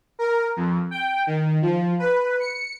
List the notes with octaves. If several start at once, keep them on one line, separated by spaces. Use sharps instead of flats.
A#4
F2
G5
D#3
F3
B4
C#7